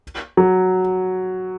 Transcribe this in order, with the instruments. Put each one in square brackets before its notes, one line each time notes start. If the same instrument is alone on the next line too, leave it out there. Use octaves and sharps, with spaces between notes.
[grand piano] F#3